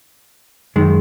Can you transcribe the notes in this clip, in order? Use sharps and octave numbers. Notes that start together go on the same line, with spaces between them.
F#2 D#3 G#3